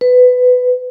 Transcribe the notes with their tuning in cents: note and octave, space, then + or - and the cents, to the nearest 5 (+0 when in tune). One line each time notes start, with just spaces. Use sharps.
B4 +15